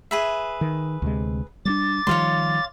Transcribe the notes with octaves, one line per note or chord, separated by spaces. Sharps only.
G#4 B4 E5
D#3
D2 C3 G#3
G3 A3 D4 D6 A6
D#3 F3 G3 C#5 F5 C6